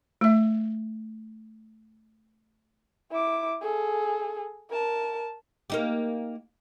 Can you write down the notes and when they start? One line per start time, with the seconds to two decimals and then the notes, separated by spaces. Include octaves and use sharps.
0.21 A3 E5
3.11 E4 D6
3.62 G#4 A4
4.70 A#4 A5
5.70 A#3 D#4 G4